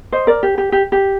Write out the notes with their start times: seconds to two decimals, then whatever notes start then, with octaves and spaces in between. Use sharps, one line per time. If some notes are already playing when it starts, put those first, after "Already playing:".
0.12 C5 D#5
0.27 A#4 D5
0.43 G4
0.58 G4
0.72 G4
0.92 G4